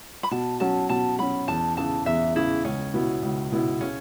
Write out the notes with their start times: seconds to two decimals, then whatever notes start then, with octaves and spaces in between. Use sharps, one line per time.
0.23 B5
0.31 B2 A5
0.60 F#3 C#4 A5
0.89 B2 A5
1.19 F#3 C#4 B5
1.48 E2 A5
1.77 C#3 E3 A5
2.06 E2 E5
2.35 C#3 E3 E4
2.64 C#2 C#4
2.94 B2 B3 E4
3.23 C#2
3.52 B2 B3 E4
3.81 C#3 C#4